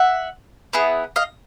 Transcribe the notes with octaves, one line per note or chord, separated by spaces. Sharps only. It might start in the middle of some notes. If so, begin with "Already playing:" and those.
Already playing: E5 F#5
B3 E4 G#4
D#5 F5